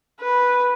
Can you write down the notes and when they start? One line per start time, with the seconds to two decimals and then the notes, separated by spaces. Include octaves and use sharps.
0.20 B4